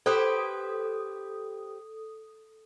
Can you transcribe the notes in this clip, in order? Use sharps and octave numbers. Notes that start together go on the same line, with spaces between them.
G4 A4 B4 C5 D#6